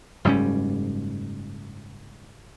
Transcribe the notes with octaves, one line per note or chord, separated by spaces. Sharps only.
F#1 G#2 G3 C#4